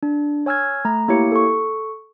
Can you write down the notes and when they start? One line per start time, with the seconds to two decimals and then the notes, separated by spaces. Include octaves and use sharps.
0.03 D4
0.46 C#5 G#5 E6 F6 G#6
0.85 A3 A#5
1.08 A#3 E4 G4 C#5 C#7
1.32 A4 C#6